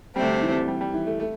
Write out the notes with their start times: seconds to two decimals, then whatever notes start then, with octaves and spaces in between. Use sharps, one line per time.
0.16 D2 C3 G3 A3 C4
0.42 E3
0.68 G3
0.81 G3
0.94 E3
1.06 A3
1.20 A3